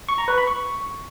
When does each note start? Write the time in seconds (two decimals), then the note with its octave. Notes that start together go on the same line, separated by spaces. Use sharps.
0.09 C#6
0.18 A#5
0.28 B4
0.38 B5
0.47 C#6